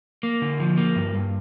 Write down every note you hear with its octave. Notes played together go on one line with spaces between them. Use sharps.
A#3
D3
F3
A#3
G2
G2